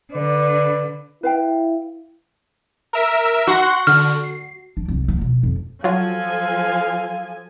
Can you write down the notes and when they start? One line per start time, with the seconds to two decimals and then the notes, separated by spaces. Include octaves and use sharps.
0.13 D3 B4 D5
1.23 E4 B4 F5 G5
2.93 A#4 E5
3.47 F#4 F#5 C6
3.87 D3 F6
4.24 C7
4.77 D4
4.88 C2
5.08 A#3
5.21 B2
5.43 F2
5.84 F3 F#3 F4 A4 F5 G#5